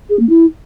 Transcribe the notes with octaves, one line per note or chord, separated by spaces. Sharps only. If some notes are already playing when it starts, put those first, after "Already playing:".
G#4
A#3
E4